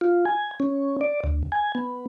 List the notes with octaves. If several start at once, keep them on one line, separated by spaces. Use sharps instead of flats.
F4
G#5
C#4
D5
D2
G#5
B3